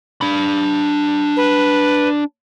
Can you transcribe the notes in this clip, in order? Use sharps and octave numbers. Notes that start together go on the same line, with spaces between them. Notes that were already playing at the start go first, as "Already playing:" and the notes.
D4 B5
B4